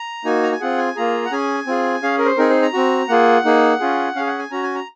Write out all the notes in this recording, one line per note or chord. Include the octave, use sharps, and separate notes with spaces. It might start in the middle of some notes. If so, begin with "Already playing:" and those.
Already playing: A#5
A#3 D#4 F#4 G#5
A#5
G#5
C4 F4 G#4 F#5
G#5
A#3 F4 G#4 A#5
F#5
C#4 G#4 G#5
C4 F4 G#4
C#4 G#4 F5
A#4
C5
C4 D#4 G#4 A#4
C5
A#5
C4 F#4
A#3 F4 G#4 F#5
A#3 D#4 G#4
C#4 F4 G#4
C#4 G#4 F5
F#5
G#5
C#4 F#4 A#5
G#5
A#5